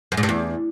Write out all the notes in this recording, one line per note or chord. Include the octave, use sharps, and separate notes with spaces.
F#2
G#2
G2
E2